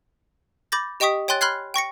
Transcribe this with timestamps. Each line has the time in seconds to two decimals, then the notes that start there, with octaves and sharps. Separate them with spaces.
0.72 B5 D6 G6 A6 A#6
1.00 G4 D#5 G5 C#6 D#6 B6
1.28 C#5 G5 G#5 C6 F#6 A6
1.41 B5 C6 F6 F#6 G#6 C7
1.74 G5 C#6 A#6 C#7